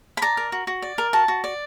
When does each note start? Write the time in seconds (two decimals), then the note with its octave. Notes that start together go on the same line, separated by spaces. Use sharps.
0.17 B5
0.22 D5 A#5
0.37 A#4
0.52 F#4
0.67 F#4
0.82 D5
0.98 A#4
1.13 F#4 A5
1.28 F#4
1.44 D5